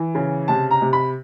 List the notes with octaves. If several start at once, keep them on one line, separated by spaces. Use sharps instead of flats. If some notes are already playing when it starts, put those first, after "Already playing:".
Already playing: E3
C#3
C3 A5
A#5
C3
B5